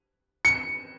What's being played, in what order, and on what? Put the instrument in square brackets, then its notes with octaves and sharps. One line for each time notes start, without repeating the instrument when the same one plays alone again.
[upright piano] C#7